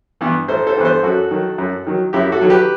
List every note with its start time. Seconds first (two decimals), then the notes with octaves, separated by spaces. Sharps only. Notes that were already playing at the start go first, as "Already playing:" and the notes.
0.21 G2 E3 B3
0.48 A1 A4 C5
0.67 A4 C5
0.77 G2 E3 B3 B4
0.85 A4 C5
1.03 F#2 F#4 A4
1.31 D#3 F#3
1.58 F#2
1.87 D#3 F#3
2.13 F#2 E4 G4
2.32 F#4 A4
2.41 D#3 F#3
2.50 G4 B4